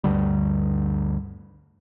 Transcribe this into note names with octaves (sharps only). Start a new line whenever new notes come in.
D2 G2 D3 G3